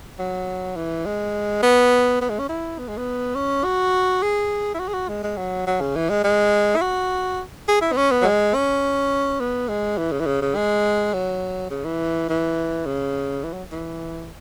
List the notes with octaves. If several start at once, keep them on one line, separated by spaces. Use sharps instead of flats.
F#3
E3
G#3
B3
B3
G#3
C#4
E4
B3
G#3
B3
C#4
F#4
G#4
E4
F#4
G#4
F#4
G#3
G#3
F#3
F#3
C#3
E3
G#3
G#3
E4
F#4
G#4
E4
B3
C#4
B3
F#3
G#3
C#4
B3
G#3
E3
C#3
E3
C#3
C#3
G#3
F#3
C#3
E3
E3
C#3
E3
F#3
E3